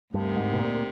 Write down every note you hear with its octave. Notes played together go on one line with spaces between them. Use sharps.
D2 G2 C3 D#3
G#2
B2
A#2